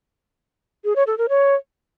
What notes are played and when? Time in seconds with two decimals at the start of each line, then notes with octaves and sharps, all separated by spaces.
0.85 G#4
0.96 C#5
1.07 A4
1.18 A#4
1.29 C#5